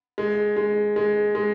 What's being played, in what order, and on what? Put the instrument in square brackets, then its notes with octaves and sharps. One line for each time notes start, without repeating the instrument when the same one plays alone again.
[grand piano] G#3
G#3
G#3
G#3